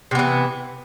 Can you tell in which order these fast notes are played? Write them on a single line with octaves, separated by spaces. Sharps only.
C3 B3 E3